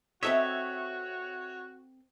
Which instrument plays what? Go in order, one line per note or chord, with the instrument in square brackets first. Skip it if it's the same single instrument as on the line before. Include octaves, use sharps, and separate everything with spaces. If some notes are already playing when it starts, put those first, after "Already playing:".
[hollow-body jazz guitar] C4 A4 D#5 [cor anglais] F#4 [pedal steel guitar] C#5 [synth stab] E5